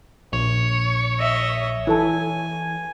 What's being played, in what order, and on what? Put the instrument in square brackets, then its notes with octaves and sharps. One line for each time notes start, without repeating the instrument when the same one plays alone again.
[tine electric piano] A#1 [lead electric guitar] C#5
[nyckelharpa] D#5 E5
[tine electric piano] E3 [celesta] E4 A4 A5 [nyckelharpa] G#5